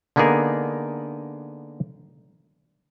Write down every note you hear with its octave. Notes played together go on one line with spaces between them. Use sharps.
D3 A#3 B3 D#4 G#4 A#4